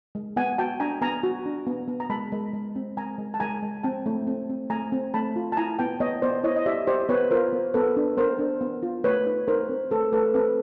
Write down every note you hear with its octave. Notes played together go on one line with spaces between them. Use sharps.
G#3
B3 F#5 G#5
F#4 G5 A5
D4 G#5 A#5
B3 G#5 A#5
F#4
D4
B3
B3
A#5
G#3 A5 B5
G#3
G#3
C4
G#3 G#5 A#5
G#3
A5
G#3 G#5 A#5
G#3
C4 G5 A5
A3
C4
C4
A3 G#5 A#5
C4
A3 A5 B5
F4
A5
E4 G#5 A#5
B3 G5 A5
B3 C#5 D#5
B3 C5 D5
E4 C#5 D#5
D#5
G4 D5 E5
G4 C5 D5
B3 B4 C#5
F4 A#4 C5
B3
B3 A4 B4
D4
B3 A#4 C5
D4
B3
F4
A3 B4 C#5
D#4
D#4 A#4 C5
C4
A3 A4 B4
A3 A4 B4
C4 A4 B4